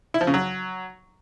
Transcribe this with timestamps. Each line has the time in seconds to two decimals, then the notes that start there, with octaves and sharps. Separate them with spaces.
0.14 E4
0.21 F3
0.27 C#3
0.34 F#3